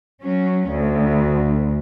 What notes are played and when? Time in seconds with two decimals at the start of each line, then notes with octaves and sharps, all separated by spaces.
0.21 F#3 C#4
0.69 D2